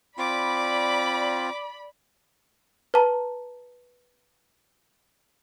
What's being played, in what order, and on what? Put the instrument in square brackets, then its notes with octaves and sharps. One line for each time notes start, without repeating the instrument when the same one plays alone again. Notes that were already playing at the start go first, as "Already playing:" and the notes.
[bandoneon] C4 F4 [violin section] D5 B5 [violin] D6
[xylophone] B4 A5 A#5